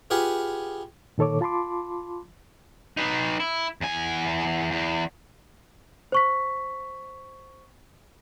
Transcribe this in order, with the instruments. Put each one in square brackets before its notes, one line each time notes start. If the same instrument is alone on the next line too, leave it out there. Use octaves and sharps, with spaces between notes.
[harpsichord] F4 G4 G#4 B4 F5 F#5
[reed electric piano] A#2 D#3 A4 C#5 D6
F4 A5 B5 C6 D6
[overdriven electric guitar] D#4 B4
E4
E2 G#5
E2
[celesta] C5 C#6 B6